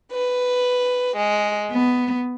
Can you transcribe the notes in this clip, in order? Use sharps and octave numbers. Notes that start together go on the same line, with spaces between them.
B4
G#3
B3